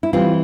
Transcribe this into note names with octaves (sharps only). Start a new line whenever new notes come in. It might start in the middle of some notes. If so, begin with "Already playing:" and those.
E4
E3 G3 C4 F4